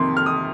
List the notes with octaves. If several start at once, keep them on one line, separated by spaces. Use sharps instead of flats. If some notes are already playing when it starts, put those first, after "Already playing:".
Already playing: F2 C3 D#3 C6
F6
D#6